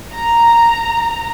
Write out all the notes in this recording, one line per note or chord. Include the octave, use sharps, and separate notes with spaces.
A#5